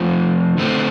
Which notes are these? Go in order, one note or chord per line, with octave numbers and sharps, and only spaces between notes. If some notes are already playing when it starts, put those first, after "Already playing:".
Already playing: F3 A3 C4 F4
D3 A3 C4